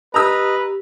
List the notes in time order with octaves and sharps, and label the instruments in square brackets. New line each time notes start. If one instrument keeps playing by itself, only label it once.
[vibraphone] G4 [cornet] B4 [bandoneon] D#5 [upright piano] A#5 E6